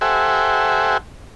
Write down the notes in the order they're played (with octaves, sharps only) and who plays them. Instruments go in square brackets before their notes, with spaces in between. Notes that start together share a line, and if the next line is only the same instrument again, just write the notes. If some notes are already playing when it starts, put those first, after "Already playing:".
[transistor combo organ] G4 A4 C5 E5 F#5 G#5